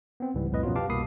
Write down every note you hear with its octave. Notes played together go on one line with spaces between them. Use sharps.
B3 C4
C#2 G#2 E3 G3
C2 F2 A2 B4 D#5
F#2 B2 F3 F#3 B3 F4
G4 B4 F5 A5 D6
C2 B2 A#3 B5 D#6 C7